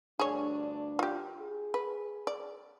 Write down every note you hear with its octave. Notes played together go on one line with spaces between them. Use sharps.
D2 G2 D4 G#4 C#5
F4 G4
G#4
B4
D5